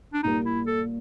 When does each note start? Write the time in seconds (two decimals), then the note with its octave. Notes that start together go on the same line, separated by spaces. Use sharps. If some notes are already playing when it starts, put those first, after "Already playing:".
0.14 D4
0.23 A#2 G3 A#3 D#4
0.45 E4
0.66 A4